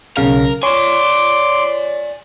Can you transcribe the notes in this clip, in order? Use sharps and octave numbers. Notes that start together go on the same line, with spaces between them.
B1 C#3 A#4 F5
C#5 D5 G#5 C6 D6